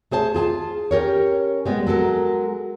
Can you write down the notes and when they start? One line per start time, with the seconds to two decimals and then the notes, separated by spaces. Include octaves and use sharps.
0.11 A3 G#4 C5 A5
0.35 F4 G#4 G#5 A5
0.91 C#4 G4 A#4 C#5
1.66 G3 G#3 B3
1.87 F#3 G#3 A4 A#4